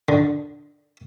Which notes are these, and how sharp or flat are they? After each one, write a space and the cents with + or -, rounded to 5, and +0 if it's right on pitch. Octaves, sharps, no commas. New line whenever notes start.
D3 +0